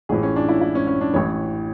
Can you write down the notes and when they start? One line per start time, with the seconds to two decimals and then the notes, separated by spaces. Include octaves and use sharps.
0.09 A1 A2 E3 G#4
0.23 C#4
0.36 D4
0.49 E4
0.61 E4
0.75 C#4
0.87 C#4
1.01 D4
1.13 A1 A2 E3 C#5